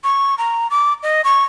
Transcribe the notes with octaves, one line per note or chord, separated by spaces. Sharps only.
C#6
A#5
D6
D#5
C#6